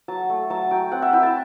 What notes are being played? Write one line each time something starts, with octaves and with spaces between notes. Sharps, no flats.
F#3 A5
A3
F#3 A5
F#3 G5
C4 F#5
E5
E4 G5
A5